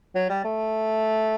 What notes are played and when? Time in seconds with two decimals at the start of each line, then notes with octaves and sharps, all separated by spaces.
0.15 F#3
0.29 G3
0.44 A3